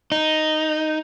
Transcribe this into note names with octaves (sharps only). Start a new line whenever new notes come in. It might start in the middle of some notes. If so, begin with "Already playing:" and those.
D#4